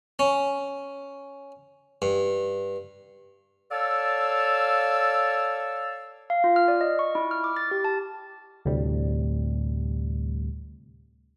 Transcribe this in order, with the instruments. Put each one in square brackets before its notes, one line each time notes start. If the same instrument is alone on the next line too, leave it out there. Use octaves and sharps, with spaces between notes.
[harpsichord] C#4
G2
[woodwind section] A4 C#5 D5 F5 A5 E6
[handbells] F5
F4
F6
D5
D#5
C#6
E4
F6
D6
A6
G4
A5
[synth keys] D2 A2 C3 G3